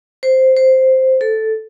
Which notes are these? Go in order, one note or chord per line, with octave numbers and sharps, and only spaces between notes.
C5
C5
A4